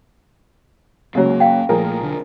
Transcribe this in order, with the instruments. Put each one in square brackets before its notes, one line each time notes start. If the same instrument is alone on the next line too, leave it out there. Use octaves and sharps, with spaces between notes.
[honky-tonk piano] C#2 C#3 F#3 [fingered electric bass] A#3
[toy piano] F5 G5
[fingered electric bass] A#2 A3 [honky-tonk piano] F3 G#4 A#4
[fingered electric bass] B1 D3